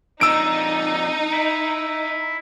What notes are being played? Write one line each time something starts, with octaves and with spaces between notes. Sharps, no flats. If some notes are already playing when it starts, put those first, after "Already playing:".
F2 D4 D#4 E6 D7
E4